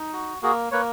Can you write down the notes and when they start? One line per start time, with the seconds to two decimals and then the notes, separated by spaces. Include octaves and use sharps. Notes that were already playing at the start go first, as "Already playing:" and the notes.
Already playing: D#4
0.13 F#4
0.42 A#3 F#4 G#4
0.72 A#3 B4 C#5